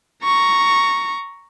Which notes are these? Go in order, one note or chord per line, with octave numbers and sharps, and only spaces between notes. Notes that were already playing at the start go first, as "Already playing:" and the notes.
A#5 C#6